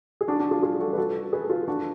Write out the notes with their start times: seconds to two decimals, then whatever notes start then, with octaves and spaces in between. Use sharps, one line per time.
0.21 G#4
0.28 D4 F#4
0.39 D4 F#4
0.51 F4 G#4
0.62 F4 G#4
0.80 F#4 A4
0.93 B4
0.98 F#4 A4
1.33 G#4 B4
1.49 F4 G#4
1.68 D4 F#4